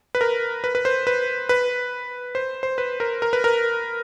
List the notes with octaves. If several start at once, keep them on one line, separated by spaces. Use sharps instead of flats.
B4
A#4
B4
B4
C5
B4
B4
C5
C5
B4
A#4
A#4
B4
A#4